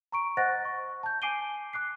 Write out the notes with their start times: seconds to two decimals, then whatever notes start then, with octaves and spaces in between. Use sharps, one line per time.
0.12 A#5 C#6 D7
0.37 C5 D#5 F#5 F#6 A6 A#6
0.65 C#6
1.03 A5 G6
1.22 G#5 D6 C7 D7 D#7 G7
1.73 D6 F#6 C7